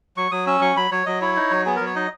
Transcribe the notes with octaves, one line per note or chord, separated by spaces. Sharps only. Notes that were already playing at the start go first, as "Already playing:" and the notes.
F#3 C#6
F#3 D#6
C#4 E6
F#3 C#6
F#3 B5
F#3 C#5
F#3 D#5
E4 C#5
D#4
F#3
B3 G#4
A#4
F#3
C#5
D#4 D#5